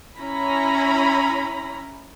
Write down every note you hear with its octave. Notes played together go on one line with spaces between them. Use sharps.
C#4 E4 A#5 B5